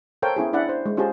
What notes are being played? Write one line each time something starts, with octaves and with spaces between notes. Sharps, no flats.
A4 A#4 C5 C#5 F5 G5
B3 C#4 E4 G#4
D4 E4 D5 F#5 B5
C5
G#3
C#4 F4 G4 G#4 C5 A5